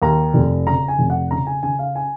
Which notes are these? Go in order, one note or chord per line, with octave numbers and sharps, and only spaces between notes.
D#2 A#5
F1
C#3 A#5
G#5
F1
F#5
C#3 A#5
G#5
C#3 G#5
F5
G#5